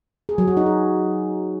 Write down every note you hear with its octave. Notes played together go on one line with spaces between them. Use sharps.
G#4
F#3
F#4
D#4
G#4